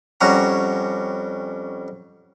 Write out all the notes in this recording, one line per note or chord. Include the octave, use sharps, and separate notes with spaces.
F2 G3 C#4 F#4 A#5